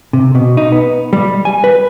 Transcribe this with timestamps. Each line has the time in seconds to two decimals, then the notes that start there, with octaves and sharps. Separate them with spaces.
0.13 C3
0.35 B2
0.57 D#4
0.72 B3
1.13 G3
1.45 G#5
1.64 B4